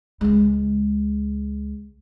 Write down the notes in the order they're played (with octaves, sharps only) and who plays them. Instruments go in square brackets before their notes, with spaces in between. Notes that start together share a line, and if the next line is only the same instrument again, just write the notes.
[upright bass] C#2 G#3